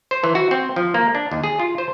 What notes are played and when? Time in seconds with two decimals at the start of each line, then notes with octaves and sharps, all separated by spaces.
0.11 C5
0.24 E3
0.35 F#4
0.51 C4
0.76 F3
0.94 A#3
1.15 D4
1.32 D#2
1.44 G#4
1.60 F4
1.78 C5